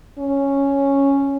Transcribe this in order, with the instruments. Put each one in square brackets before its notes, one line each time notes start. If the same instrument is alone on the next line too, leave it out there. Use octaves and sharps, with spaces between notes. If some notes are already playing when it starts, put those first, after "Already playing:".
[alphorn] C#4